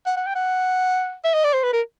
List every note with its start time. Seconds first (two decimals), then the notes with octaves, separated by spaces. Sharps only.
0.06 F#5
0.16 F#5
0.26 G5
0.35 F#5
1.24 E5
1.34 D#5
1.44 D5
1.54 C5
1.63 B4
1.73 A#4